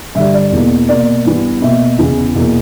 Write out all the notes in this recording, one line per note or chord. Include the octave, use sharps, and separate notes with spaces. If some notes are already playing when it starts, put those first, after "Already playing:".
G2 D3 G3 E5
D5
E2 B2 A#3
B2 A#3 D5
G2 E3 G3 B3
B2 A#3 E5
E2 C#3 E3 B3
E2 B2 A#3